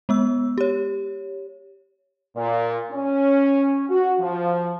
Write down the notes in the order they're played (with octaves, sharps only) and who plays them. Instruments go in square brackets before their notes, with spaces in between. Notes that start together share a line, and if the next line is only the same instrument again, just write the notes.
[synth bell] G#3 B3 E6
G4 C#5
[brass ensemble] A#2
C#4
F#4
F3